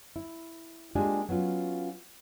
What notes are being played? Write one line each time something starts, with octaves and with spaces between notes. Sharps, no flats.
E4
G#3 A#3 D4 F4 G4 G#5
F#3 B3 C#4 F4